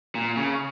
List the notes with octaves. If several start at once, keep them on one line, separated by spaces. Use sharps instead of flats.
A#2
C#3